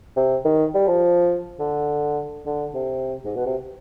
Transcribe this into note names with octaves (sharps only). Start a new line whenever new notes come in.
C3
D#3
G3
F3
D3
D3
C3
G#2
B2
C3